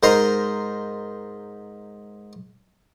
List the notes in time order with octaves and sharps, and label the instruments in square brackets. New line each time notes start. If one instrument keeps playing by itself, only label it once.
[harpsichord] G#2 A#4 C5 D#5 A#5 C6